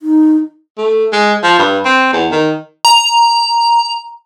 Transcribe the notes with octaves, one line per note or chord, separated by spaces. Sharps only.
D#4
A3
G#3
F3
G2
C4
E2
D#3
A#5